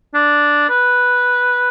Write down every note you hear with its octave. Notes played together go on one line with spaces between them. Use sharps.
D4
B4